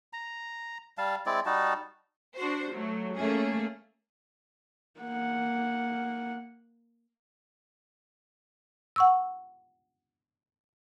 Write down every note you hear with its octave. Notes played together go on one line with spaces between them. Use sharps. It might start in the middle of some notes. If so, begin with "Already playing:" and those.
A#5
G3 F5 A5
G#3 C4 E4 D5
G3 D#4 F#4 A5
D4 F#4 C5
F#3 A3
A3 A#3 C#4 G#4
A#3 F#5
F#5 C#6 E6